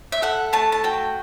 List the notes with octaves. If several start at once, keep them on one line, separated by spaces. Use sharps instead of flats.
E5
A4 F#5
A3 A5
A5
F#4 G5